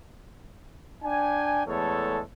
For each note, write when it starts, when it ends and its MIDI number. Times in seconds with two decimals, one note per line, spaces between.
1.03 1.61 62
1.03 1.61 79
1.03 1.61 80
1.65 2.20 40
1.65 2.20 56
1.65 2.20 57
1.65 2.20 69
1.65 2.20 73